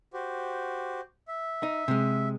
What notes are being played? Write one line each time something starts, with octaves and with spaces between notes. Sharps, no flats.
F#4 G4 C5
E5
D#4
C3 G#3